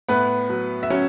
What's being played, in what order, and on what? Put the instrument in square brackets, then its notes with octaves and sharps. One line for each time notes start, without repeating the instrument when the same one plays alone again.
[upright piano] A2 B3 B4
F#3
E5
F#3 C#4 C#5